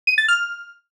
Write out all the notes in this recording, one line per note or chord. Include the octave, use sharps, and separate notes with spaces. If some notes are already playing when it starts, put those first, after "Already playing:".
D#7
A6
F6